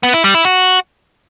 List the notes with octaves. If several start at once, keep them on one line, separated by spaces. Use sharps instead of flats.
B3
E4
G3
E4
F#4